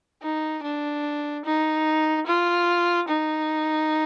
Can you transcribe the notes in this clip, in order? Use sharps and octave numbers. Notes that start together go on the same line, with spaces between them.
D#4
D4
D#4
F4
D#4